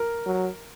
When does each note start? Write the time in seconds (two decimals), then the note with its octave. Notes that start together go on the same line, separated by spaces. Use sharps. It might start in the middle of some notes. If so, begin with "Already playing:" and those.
Already playing: A#4
0.26 F#3